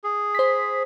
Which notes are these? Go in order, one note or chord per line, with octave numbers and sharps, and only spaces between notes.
G#4
C5 B6